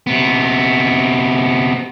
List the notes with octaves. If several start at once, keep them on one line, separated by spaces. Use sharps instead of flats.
C3 B3